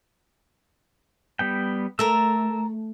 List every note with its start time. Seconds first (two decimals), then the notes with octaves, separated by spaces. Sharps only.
1.39 G3 B3 G5
1.99 A3 A4 A#4 A#5 E6